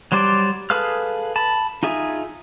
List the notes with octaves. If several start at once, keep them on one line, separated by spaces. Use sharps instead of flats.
F#3 G3 C5 D5
G#4 A4 B4 F5 F6
A5 B5
D#4 F4 G#4 E5